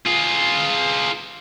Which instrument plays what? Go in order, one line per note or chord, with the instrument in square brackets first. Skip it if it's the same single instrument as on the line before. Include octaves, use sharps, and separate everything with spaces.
[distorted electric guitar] F4 G#4